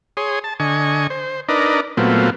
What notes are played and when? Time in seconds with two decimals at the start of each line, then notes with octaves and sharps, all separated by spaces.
0.17 G#4 C#5 C6 D#6
0.44 A5
0.60 D3 D#5 G#5 C#6
1.10 C5
1.49 D4 D#4 A#4 B4 D5 D#5
1.97 A#2 F#3 A3 B3 C4 F4